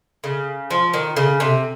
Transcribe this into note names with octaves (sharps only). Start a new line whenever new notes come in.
C#3
F3
D#3
C#3
C3